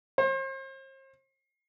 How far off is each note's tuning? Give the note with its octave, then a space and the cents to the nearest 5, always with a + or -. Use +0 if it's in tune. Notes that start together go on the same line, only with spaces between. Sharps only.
C5 +40